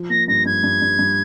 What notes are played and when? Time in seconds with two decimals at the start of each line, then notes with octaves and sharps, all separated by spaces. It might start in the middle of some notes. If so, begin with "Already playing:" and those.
Already playing: F3
0.10 A#3 A#6
0.28 G2 A#6
0.45 G2 G#6
0.63 G2
0.82 G2
0.99 G2